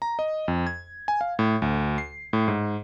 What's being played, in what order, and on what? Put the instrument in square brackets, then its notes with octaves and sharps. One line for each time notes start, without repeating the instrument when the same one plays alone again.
[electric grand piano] A#5
D#5
F2
G#6
G#5
F5
A2
D2
C7
A2
G#2